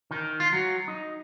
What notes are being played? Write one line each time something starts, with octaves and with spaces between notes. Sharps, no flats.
D#3
F4
F#3
D#4